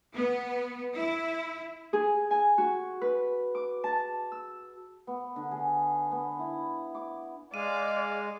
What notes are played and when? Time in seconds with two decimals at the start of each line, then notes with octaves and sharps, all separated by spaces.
0.15 B3
0.96 E4
1.93 G#4
2.31 G#5
2.58 F#4
3.01 B4
3.55 D6
3.84 A5
4.32 E6
5.07 B3
5.36 D3
5.51 G#4
6.11 B3
6.39 E4
6.95 D6
7.54 G#3 D5 F5 D#7